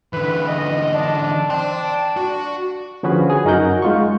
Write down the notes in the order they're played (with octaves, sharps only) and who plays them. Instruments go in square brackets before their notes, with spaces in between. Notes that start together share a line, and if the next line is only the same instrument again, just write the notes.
[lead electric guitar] D3 E3 [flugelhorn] B4
[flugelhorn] D#5
D4
[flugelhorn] D4 [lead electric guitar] G5 C6
[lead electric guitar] F#4
[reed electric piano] D3 F3 C#4 F#4 G#4 B4
G#4
F#2 D#4 F#4 A#4 F#5 G6
G#3 F4 C#6